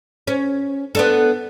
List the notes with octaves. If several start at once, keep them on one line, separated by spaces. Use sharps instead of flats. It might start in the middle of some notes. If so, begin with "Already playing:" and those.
C#4
B3 D4 A4